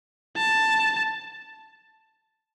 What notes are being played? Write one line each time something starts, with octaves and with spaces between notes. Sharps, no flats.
A5